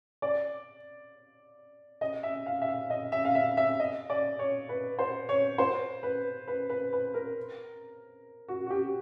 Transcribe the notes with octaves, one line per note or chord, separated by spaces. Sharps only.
D5
D#5
E5
F5
E5
F5
D#5
E5
F5
E5
E5
D#5
D5
C#5
B4
C5
C#5
C5
B4
B4
B4
B4
A#4
F#4
F#4
G4